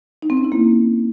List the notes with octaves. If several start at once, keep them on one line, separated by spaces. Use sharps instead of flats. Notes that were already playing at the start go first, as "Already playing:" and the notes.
D#4
C4
C#4
E4
A#3